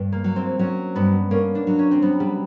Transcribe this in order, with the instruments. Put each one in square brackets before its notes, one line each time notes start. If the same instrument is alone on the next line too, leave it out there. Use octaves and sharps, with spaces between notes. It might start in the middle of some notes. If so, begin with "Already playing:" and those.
Already playing: [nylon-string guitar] G2
[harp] A#3
[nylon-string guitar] F#3
[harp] C4
[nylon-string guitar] F#3 [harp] C#4
[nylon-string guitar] G2 [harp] B3
[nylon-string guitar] A#3 [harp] C#4
[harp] D4
[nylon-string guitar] F#3
[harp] C#4
C4
[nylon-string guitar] F#3 [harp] B3
[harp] G3